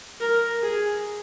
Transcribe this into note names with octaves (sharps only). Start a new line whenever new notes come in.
A#4
G#4